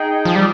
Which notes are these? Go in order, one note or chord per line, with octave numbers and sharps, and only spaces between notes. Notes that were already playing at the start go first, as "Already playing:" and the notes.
Already playing: D#4 G#4 D#5 G5
F3
G3